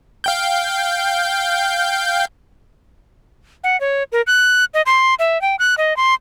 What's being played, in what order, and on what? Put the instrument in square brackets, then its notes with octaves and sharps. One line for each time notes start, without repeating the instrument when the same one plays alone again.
[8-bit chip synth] F5 G5 G6
[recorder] F#5
C#5
A#4
F#6
D#5
C6
E5
G5
F#6
D#5
C6